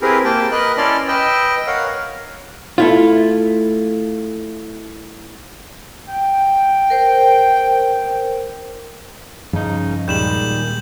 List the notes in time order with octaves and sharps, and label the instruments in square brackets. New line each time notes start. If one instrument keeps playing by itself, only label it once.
[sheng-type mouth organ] C4 E4 G4 G#4 A#4 B4
A#3 G5 A5
A#4 B4 D#5 F#6
C#4 E4 D5 A5 C6 F6
B4 D#5 G5 E6
A#4 C#5 F5 F#5
[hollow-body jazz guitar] A3 E4 F4
[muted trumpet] G5
[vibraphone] A#4 C5
[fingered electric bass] G2 F3 [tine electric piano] C#3 D#4
[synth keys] D#2 A#2 G#3 [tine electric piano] D#3 G3 [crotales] G6 E7 F#7